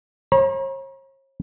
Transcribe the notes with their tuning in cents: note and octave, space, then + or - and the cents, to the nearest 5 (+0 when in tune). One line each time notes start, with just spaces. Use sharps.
C#5 -45 A#5 +40